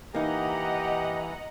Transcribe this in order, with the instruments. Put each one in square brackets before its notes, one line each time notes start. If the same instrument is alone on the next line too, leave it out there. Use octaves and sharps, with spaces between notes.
[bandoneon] E3 [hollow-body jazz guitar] A#3 D#4 [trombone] G4 [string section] D#5 F#5 A#5